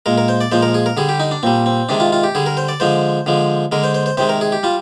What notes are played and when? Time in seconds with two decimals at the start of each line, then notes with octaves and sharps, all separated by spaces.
0.06 A#2 G#3 A#4
0.18 A#4
0.28 C5
0.41 D5
0.51 A#2 F3 G#3 C5
0.62 A#4
0.74 G#4
0.86 A#4
0.97 D3 G3 G#4
1.09 G4
1.20 D#4
1.31 D4
1.43 A#2 G3 C4
1.66 C4
1.89 C3 D#3 G#3 D4
2.00 F4
2.12 F4
2.23 G4
2.35 D3 G3 G#4
2.46 A#4
2.57 C5
2.68 D5
2.80 D3 F3 G#3 C5
3.26 D3 F3 G#3
3.72 D3 G#3 A#4
3.84 C5
3.94 C5
4.06 C5
4.17 C3 D#3 G#3 C5
4.29 A#4
4.41 G#4
4.52 G4
4.63 G3 F4